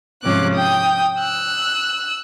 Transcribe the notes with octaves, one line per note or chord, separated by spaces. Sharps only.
G#2 C3 F3 C#4 D6 F#6
G5 D#6 G6
E6 F#6